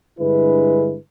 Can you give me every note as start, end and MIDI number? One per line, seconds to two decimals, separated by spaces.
0.20 0.97 43
0.20 0.97 50
0.20 0.97 56
0.20 0.97 64
0.20 0.97 71